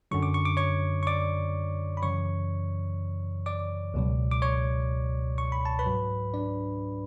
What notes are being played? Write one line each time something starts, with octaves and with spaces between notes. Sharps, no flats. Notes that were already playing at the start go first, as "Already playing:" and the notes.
F#2 D3 F#3 C#6
D6
C#6
D6
C#5 C#6
C#6
D5 D6
B5
F#2 C#3 E3 C#5 C#6
D5 D6
C#2 B2 F#3
D6
C#5 C#6
C#6
B5
A5
B4 B5
G#2 F#3
D4 D5